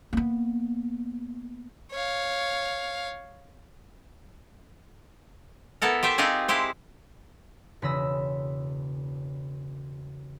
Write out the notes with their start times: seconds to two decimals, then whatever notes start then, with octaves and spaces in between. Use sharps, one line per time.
0.13 A#3 B3
1.91 C#5 F5
5.82 B3 E4 A4 A#4
6.03 G4 C5 E5 G5
6.18 C4 D#4 F4 G4 G#4
6.48 G#3 E4 G4 C5
7.82 E1 C#3 B5 D#6 E6 A#6